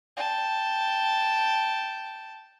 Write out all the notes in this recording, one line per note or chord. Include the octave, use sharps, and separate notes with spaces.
G5 A5